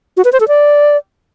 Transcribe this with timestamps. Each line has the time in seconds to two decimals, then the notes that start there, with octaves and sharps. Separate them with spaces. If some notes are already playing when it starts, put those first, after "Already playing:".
0.17 F#4
0.25 B4
0.33 C5
0.40 A4
0.48 D5